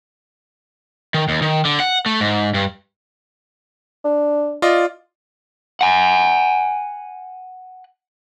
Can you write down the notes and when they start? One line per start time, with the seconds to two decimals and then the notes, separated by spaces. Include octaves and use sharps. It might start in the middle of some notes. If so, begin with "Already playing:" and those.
1.14 D#3
1.29 D#2
1.42 D#3
1.65 D3
1.80 F#5
2.06 A3
2.20 G#2
2.54 G2
4.04 D4
4.62 F4 D5 D#5
5.81 F#5 G#5